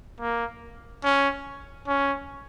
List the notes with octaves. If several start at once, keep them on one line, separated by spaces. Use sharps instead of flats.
A#3
C#4
C#4